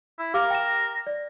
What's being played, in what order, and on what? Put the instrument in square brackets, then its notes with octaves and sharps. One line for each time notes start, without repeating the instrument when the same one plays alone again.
[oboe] E4
[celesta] G4 F5 D6 [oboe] A#4 [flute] A#5
[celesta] G5 E7 [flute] A#6
[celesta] D5